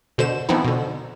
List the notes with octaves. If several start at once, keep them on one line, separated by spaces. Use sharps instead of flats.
B2 D3 C5 E7
E3 F3 B3 C4 D#4 E4
B2 D3